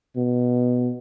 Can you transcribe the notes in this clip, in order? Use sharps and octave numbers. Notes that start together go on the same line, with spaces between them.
B2